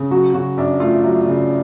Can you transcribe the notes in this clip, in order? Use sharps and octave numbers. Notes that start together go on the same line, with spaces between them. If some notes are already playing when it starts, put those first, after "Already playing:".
Already playing: C#3
F#3 F#4
C#3 F#4
F#2 D4
A3 F4
F#3
C#3